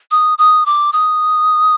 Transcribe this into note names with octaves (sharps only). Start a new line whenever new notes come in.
D#6
D#6
D6
D#6